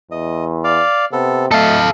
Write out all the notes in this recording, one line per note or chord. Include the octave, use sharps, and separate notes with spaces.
E2 D#5
D5 F5
C3 B3 A4
A3 A4 D#5 F5 A5